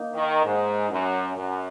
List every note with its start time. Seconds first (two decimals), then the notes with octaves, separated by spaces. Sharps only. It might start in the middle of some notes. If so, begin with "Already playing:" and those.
Already playing: A#3 D#4
0.14 D#3
0.44 G#2
0.90 F#2
1.36 F#2